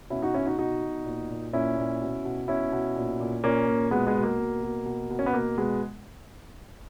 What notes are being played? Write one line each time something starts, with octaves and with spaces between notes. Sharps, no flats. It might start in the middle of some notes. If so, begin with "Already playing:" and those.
B2 C#4 E4
D#4 F#4
B2 C#4 E4
D#4 F#4
B2 D#4 F#4
B2
A#2
A#2
A#2 C#4 E4
A#2
B2
B2
B2 C#4 E4
B2
A#2
A#2
A#2 A#3 C#4
A#2
B2 G#3 B3
G#3 B3
B2
A#3
B2
B2
B2
B2
C#4
B3
B2 A#3
B2 G#3 B3